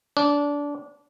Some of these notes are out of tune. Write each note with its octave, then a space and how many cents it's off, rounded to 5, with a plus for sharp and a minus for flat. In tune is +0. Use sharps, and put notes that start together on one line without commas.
D4 -20